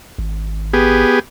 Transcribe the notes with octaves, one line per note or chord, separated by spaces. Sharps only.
G#1
B3 G4 G#4